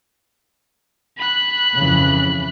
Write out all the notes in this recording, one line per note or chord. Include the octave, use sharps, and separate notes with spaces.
B5 F#6
F2 C#3 E3